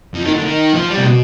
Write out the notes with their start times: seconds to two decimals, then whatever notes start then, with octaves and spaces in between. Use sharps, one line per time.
0.14 F2
0.24 D#3
0.34 D3
0.44 D#3
0.74 F3
0.90 G3
0.97 C3
1.05 B2